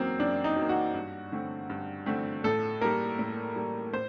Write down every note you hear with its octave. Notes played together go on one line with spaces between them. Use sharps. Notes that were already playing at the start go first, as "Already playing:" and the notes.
Already playing: F#2 F#3 A#3 C4
F#2 D4
D#4
F#3 A#3
F#4
G2
D3 A3 C4
G2
D3 A3 C4
A2 A4
G3 A#3 A#4
A2
G3 A#3
A2 C5